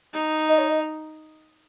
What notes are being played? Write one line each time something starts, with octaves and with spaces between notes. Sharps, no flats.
D#4
D#5
C#5
D#5